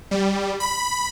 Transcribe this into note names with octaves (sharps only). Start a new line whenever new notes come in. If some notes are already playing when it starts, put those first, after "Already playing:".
G3
B5